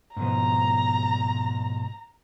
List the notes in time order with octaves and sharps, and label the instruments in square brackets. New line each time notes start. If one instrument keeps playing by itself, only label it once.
[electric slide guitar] G#2 B2 F3 [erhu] A#5